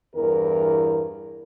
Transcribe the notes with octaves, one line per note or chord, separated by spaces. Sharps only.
E2 G2 E3 A#4